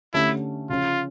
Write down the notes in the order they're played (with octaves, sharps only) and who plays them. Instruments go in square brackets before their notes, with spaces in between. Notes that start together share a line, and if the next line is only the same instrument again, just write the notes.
[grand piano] D3 A3 C#4 G4 [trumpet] E4
[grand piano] C#3 F3 C#4 [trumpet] F4